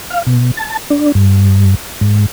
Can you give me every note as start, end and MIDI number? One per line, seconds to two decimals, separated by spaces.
0.10 0.22 77
0.27 0.51 47
0.57 0.77 81
0.90 1.12 62
1.15 1.75 43
2.01 2.26 44